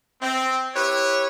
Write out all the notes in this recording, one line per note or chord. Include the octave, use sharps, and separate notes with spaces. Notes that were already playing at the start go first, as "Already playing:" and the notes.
C4
E4 G4 B4 C#5